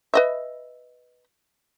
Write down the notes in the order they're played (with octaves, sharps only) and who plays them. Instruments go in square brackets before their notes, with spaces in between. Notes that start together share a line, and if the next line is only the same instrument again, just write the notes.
[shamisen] B4 D#5 E5